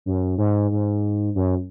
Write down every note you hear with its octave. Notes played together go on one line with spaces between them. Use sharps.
F#2
G#2
G#2
F#2